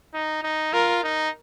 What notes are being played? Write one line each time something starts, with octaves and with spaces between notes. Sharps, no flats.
D#4
D#4
F4 A#4
D#4